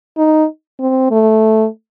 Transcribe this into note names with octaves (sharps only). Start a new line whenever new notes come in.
D#4
C4
A3